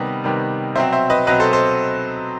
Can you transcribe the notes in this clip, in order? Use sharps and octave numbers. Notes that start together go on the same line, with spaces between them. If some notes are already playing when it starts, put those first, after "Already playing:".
Already playing: C3 D#3 G3 B3 B4 D#5
C3 D#3 G3 B3
B2 F#3 C4 C5 E5
C5 E5
B4 D#5
B2 F#3 C4 B4 D#5
A4 C5
A4 C5